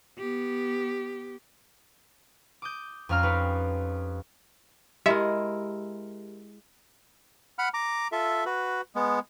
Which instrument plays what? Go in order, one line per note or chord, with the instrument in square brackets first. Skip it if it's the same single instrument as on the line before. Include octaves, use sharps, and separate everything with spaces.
[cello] B3 G4
[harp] D6 D#6 G6
F2 C#4 F5 A#5 F6
D#4 G4 B4 C#5
[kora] G#3 E4 A#4 [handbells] G4 [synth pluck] E5
[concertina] F#5 B5 F6
A#5 D6
F4 A4 E5
F#4 B4
G#3 B3